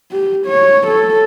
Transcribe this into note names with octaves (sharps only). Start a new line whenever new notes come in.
G4
C#5
A4